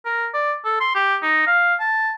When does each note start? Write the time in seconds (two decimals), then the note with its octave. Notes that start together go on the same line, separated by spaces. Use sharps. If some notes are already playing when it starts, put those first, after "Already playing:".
0.05 A#4
0.34 D5
0.65 A4
0.81 C6
0.95 G4
1.22 D#4
1.47 F5
1.80 A5